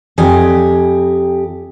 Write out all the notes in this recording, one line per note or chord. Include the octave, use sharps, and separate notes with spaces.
F2 G4 D#5 G#5